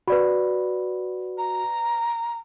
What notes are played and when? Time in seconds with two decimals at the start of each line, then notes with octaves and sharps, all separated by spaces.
0.08 F#4 B4 D5 B5
1.38 A#5